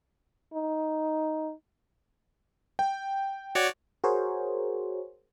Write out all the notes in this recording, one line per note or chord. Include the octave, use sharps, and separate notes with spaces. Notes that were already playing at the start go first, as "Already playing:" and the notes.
D#4
G5
F#4 C#5 D5
F#4 G#4 A#4 C5 C#5